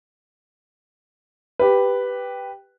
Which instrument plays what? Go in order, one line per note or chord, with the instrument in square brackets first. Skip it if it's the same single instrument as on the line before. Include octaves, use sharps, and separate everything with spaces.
[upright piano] G4 B4